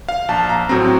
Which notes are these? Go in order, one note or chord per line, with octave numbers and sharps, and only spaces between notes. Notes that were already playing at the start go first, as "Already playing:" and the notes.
F5
A#1 A5
A#5
A2 F#3 C4 A#5